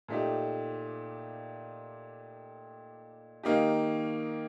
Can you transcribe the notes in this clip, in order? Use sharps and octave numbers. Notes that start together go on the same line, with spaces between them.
A#2 A3 D#4 G4
D#3 A#3 D#4 G4